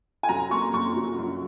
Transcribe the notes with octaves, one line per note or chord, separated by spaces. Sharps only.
G#5
F#2 A#5
A#3 C#6
F#2 C#6
F#3
F#2